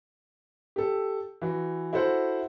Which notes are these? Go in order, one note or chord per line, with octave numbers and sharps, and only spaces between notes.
G4 A4
E3 F#4
E4 F#4 A4 C5 F#5